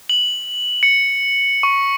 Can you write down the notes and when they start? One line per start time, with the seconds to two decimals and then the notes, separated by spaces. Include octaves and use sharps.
0.09 F#7
0.83 C#7
1.63 C#6